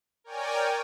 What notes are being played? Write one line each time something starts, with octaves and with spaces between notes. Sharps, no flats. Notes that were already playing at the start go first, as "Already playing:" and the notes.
A#4 C#5 D5 G5 G#5